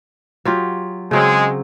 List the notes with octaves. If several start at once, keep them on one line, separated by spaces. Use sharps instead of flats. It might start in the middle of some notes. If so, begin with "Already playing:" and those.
F#3 F4 G4
C#3 F#3 G#3 C4